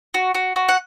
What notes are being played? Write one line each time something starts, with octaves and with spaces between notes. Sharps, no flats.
F#4
F#4
F#4
F#5